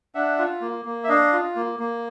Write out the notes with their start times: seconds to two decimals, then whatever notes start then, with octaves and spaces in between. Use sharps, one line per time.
0.15 D4 E5 F#5
0.38 F4
0.61 A#3
0.85 A#3
1.04 E5
1.09 D4 D#5 F5
1.32 F4
1.56 A#3
1.80 A#3